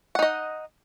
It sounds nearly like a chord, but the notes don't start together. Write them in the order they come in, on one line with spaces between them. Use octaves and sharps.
F#5 D#4 D#5